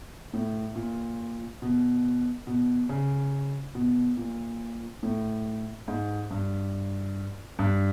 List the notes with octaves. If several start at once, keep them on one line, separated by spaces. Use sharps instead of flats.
A2
A#2
B2
B2
C#3
B2
A#2
A2
G#2
G2
G2